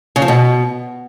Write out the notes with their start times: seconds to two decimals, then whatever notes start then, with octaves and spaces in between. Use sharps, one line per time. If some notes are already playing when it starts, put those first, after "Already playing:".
0.16 C#3
0.22 F3
0.28 B2